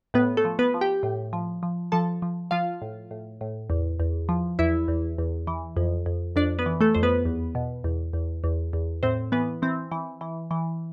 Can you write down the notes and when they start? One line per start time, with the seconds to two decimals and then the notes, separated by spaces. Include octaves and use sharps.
0.14 A2 B3 B4
0.37 A3 A4
0.45 F3
0.59 B3 B4
0.74 F3
0.81 G4 G5
1.03 A2
1.33 F3
1.63 F3
1.92 F3 A4 A5
2.22 F3
2.51 F3 F4 F5
2.82 A2
3.11 A2
3.41 A2
3.70 E2
4.00 E2
4.29 F3
4.59 E2 E4 E5
4.88 E2
5.18 E2
5.47 E3
5.77 F2
6.06 F2
6.36 F2 D4 D5
6.59 B3 B4
6.66 E3
6.81 A3 A4
6.95 F2 C5
7.03 B3 B4
7.25 E2
7.55 B2
7.84 E2
8.13 E2
8.44 E2
8.73 E2
9.03 A2 C4 C5
9.32 E3 B3 B4
9.62 E3 C4
9.91 E3
10.21 E3
10.51 E3